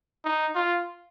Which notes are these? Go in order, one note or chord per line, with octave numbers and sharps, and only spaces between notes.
D#4
F4